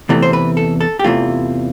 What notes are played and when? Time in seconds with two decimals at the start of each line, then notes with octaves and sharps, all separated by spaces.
0.09 E2 C3 E3 A3
0.22 C5
0.33 B4
0.57 A4
0.81 A4
0.99 G4
1.04 E2 C3 E3 A3 F4